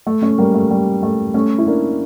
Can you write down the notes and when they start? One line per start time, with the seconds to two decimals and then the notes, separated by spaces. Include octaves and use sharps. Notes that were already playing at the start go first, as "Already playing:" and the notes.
0.06 A3
0.22 A3 C#4
0.38 G3 A#3
0.54 A3
0.70 G3
1.03 A3
1.34 A3 C#4
1.58 E4
1.67 A#3 D4